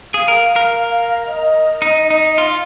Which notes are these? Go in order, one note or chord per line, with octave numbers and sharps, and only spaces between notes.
G#4 F5
A#4
A#4
D#5
D#4
D#4
F4 F5